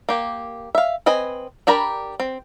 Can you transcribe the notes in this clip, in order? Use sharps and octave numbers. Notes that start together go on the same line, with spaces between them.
A#3 G4
E5 F5
C4 B4 D#5 G#5
D4 G4 A#4 A#5 B5
C4